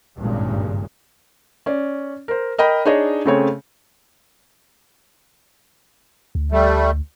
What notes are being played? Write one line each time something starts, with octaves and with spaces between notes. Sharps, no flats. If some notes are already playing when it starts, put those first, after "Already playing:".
G#1 D2 G2 A#2 C#3 G#3
C#4 D5
A#4 C5
A#4 D#5 G5 B5
D4 D#4 G#4 C#5 D#5
C#3 A3 C4 G#4 C#5
D2
G3 A3